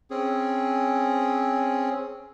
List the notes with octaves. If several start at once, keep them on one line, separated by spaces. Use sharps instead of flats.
C4 C#4 G#4